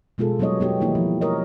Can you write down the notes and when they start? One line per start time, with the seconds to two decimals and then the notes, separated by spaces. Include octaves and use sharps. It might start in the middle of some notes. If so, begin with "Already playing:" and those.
0.18 B2 G#3 B3 F4 G#4 A4
0.39 F#3 G3 B3 D#4 C#5 D#5
0.60 B3 D#4 G4
0.80 D#3 E3 A#3 D#4 E4
0.95 F3
1.21 A#4 C#5 D#5